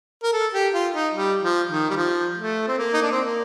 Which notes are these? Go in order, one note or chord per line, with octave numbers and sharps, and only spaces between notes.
A#4
A4
G4
F4
D#4
G3
F3
D#3
G3
F3
A3
C4
A#3
D#4
D4
C4
A#3